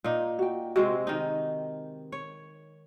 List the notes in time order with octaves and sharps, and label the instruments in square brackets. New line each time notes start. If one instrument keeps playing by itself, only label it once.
[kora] A#2 D#4
[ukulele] F#4 G5
[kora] C3 G#3 C4 [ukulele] F#4
[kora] D#3 D#4
C#5